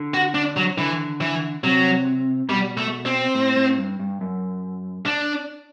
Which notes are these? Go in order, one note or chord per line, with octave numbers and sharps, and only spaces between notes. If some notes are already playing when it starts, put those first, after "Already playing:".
Already playing: D3
F#4
D4
F#3
D3 E3
E3
C3 F#3
B2 G3
A3
C4
A2
A2
G2
G2
F#2
D4